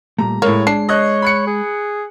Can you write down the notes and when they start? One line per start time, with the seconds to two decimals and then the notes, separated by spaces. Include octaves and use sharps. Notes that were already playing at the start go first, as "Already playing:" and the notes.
0.19 A#2 G3 A3 A#5
0.42 A2 G#3 A#3 C#5
0.67 D4 C7
0.89 C#5 D#5 F#6
1.22 B5 F#6 C#7
1.47 G#4